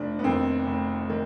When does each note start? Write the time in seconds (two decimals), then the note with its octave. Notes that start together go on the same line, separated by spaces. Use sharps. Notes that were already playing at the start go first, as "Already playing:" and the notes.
Already playing: F1 D4
0.19 B3
0.24 F2 D#3 C4
0.66 F1
1.10 D#3